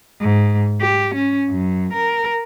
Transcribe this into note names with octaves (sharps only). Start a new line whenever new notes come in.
G#2
G4
C#4
F#2
A#4